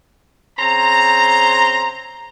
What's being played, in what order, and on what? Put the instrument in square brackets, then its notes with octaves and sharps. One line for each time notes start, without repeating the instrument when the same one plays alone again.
[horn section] C#3 C4 C5 A#5